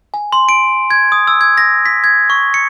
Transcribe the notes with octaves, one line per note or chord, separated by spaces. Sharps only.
G#5
C6
D7
G#6
D#6
E6
G#6
A#6
B6
G#6
C#6
C#7